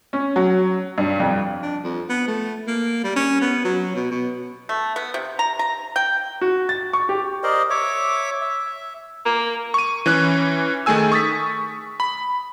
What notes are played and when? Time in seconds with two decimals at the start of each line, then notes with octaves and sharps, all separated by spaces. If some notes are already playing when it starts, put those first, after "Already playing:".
0.13 C#4
0.36 F#3
0.98 G2
1.20 F2
1.63 D4
1.83 F2
2.09 B3
2.28 A3
2.67 A#3
3.04 G3
3.16 C#4
3.41 B3
3.65 F#3
3.95 B2
4.11 B2
4.69 A3
4.96 B3
5.14 C3
5.39 A#5
5.59 A#5
5.96 G5
6.41 F#4
6.69 A6
6.93 C#6
7.09 G4
7.43 A#4 C5 D5 D#5
7.70 C#5 E5 D6
8.42 E5
9.25 A#3
9.74 C#6 D#7
10.06 E3 C#4 F#6
10.86 D#3 A3 G#4 G#5 E6
11.12 C#6 D#6 A6 B6
12.00 B5